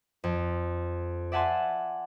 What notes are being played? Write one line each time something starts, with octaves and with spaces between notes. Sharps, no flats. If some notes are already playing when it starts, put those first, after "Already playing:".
F2
D5 E5 F#5 G#5 A5 C6